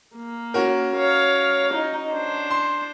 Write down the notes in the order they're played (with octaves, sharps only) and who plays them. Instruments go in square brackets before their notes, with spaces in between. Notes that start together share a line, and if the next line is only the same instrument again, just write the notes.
[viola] A#3
[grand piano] C#4 F#4 A#4
[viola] C#5 F5
D#4
D4 C5
[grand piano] C6